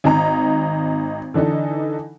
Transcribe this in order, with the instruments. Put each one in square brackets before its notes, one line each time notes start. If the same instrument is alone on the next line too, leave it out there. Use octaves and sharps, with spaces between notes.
[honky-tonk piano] G#1 D#4 A#5
D3 E3 D4 D#4 A4